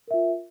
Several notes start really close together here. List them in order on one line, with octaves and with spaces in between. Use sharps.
A#4 E5 F4